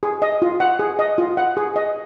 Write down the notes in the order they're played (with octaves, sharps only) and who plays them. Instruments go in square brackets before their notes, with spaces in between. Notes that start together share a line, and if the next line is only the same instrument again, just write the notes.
[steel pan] G#4
D#5
F4
F#5
G#4
D#5
F4
F#5
G#4
D#5